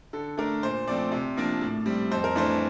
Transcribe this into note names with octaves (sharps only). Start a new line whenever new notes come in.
D3 A4
A3 D4 A#4
A#2 C5
F3 A3 C4 D5
C3
F3 A#3 D4
A2
G3 C4
F2 C5
A#4
E3 A3 D4 C5